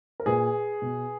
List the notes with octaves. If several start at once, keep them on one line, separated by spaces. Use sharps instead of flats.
A#4
A#2 G#4 B4
B2